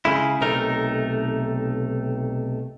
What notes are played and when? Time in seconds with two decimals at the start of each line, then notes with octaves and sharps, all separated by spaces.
0.05 C#3 G#3 E4
0.41 B1 C3 A3 D#4 A#4